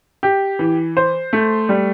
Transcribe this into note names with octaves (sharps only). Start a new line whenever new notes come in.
G4
E3
C5
A3
G3